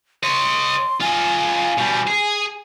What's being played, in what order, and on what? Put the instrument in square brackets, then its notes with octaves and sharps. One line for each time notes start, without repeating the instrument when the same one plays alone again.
[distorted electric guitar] C#5 D#5 [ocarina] C6
[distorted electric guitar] F4 D#5 [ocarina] G#5
[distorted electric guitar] B2 G3
G#4